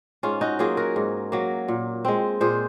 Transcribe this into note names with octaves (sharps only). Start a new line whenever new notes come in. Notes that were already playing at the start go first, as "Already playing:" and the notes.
G#2 C#4 F4
D#4 F#4
F#3 A#3 F4 G#4
F#4 A#4
G#2
F#3 A#3
A#2
G#3 C4
A#2 G#4 C5